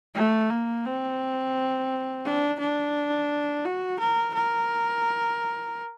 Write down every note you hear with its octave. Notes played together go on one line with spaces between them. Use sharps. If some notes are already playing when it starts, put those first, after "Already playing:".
A3
A#3
C4
D4
D4
F#4
A#4
A#4